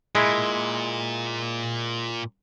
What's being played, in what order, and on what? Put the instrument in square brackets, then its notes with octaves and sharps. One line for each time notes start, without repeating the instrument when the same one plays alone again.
[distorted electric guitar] A#2 [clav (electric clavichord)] G#3 E4